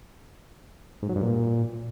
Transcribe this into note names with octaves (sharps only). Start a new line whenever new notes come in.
G#2
F#3
G2
A#2